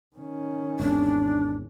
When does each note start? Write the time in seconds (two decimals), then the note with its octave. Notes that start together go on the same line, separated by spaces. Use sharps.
0.16 D#3 C#4
0.80 G#1 E2 D4